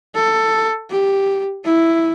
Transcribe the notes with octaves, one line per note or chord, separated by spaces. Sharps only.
A4
G4
E4